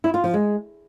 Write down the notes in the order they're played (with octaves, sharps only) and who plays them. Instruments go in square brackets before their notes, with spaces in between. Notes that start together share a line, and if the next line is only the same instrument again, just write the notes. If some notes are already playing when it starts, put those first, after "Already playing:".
[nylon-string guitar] E4
F4
F3
G#3